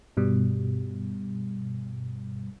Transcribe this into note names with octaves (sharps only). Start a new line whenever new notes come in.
G2 B2 G3